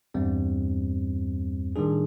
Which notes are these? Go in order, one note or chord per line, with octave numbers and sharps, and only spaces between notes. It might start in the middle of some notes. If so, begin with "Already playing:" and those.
E2 G2 G3 C4
A2 D#3 G3 D4 G#4